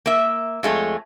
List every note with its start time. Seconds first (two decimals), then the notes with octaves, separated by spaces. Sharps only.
0.06 A#3 E5
0.63 F2 G#3 A3 C#5